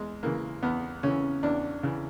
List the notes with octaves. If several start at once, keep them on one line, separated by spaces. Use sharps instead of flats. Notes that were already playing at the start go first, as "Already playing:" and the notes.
Already playing: E2 G#3
C#3 E3 A#3
E2 B3
C#3 E3 C#4
E2 D4
C#3 E3